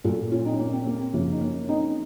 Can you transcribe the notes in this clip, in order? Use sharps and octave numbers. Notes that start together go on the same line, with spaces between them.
A#2 F#3 F4 A4
C#4 F4
C4 D#4
A#3 C#4
C4
A#3
C4
F#2 C#3 F3 A#3 C#4
D#4
A#3 C#4
C4 D#4